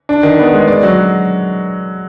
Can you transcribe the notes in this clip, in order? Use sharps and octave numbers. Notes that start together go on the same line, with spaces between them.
D4
D#3
B3
G#3
D5
F#3